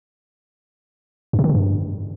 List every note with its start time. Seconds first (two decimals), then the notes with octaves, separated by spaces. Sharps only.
1.33 G2
1.39 C3
1.44 D#3
1.49 C3
1.55 G2